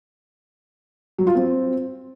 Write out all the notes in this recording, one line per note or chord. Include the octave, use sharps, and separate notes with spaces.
F#3
F4
C4